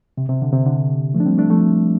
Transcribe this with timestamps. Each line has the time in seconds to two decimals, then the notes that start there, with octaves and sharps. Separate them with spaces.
0.18 C3
0.29 C3
0.42 D3
0.53 C3
0.66 D3
1.14 F3 A3
1.20 D4
1.26 G3 C4
1.38 A3 D4
1.50 F3 A3